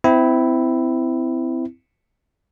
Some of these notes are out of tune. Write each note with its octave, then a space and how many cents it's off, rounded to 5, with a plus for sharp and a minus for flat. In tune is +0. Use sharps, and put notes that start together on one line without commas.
C4 -25 E4 +0